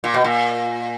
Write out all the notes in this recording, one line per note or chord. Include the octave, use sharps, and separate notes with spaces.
A#2
B2
A#2